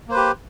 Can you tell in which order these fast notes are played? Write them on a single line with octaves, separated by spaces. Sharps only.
A#3 C5 B4 G4